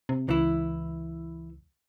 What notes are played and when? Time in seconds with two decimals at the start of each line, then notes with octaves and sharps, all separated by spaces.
0.09 C3
0.29 C#2 E3 E4